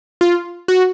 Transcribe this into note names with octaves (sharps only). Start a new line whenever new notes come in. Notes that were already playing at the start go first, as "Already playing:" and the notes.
F4
F#4